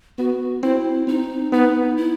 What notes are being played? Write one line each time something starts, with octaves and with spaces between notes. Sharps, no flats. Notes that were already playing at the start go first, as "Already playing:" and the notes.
B3 F#4
C4 E4
C4 D#4
B3 D#4
E4